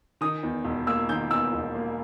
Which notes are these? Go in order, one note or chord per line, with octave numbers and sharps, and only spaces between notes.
D#3 D#6
E2
E1
A#3 E6
D#3 G6
E2 E6
E1
A#3